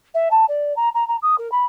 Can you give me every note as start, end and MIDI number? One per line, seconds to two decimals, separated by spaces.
0.14 0.28 76
0.31 0.45 81
0.48 0.73 74
0.76 0.89 82
0.94 1.06 82
1.08 1.16 82
1.22 1.35 87
1.38 1.50 70
1.51 1.65 83